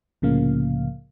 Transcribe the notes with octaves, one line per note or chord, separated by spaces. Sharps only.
C2 A2 C#3 F3 A#3 F5